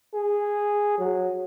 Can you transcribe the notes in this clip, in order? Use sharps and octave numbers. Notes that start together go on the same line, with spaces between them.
G#4
F#3